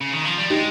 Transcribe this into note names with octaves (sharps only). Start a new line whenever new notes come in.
C#3
D#3
F3
G3
G#3 D#4 G4